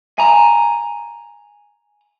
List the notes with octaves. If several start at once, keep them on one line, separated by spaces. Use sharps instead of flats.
G#5 A#5